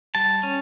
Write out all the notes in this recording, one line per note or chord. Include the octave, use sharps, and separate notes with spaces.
G3 A5
C#4